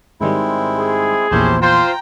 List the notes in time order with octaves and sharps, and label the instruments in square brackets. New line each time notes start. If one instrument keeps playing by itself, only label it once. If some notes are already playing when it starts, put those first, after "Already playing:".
[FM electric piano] G#2 D#3 G3 [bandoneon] G#3 C4 E4
[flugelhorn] G#4
[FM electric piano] A#1 E2 A#2 [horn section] C#4 E4 C5 [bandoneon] G4 A5
[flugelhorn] F4 [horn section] C5 [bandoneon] G5 A#5